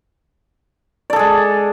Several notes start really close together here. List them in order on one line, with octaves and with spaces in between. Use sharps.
D5 A4 G#4 G#3